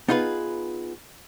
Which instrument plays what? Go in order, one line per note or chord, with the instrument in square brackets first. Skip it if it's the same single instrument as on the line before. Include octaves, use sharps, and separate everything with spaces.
[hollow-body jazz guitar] B3 D#4 F4 G#4 B4